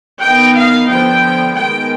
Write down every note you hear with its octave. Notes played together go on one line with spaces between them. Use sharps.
D#3 B3 D#4 G5
F5
D3 F3 B3 G5
D#3 G#3 B3 G5